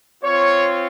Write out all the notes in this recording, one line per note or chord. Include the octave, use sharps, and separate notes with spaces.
C4 F4 C#5